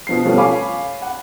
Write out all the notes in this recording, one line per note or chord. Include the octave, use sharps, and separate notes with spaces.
B2 F3 C7
F3 G3 A3 B3 C#4
C#5 F5 G#5 B5 C#6 D6
F#5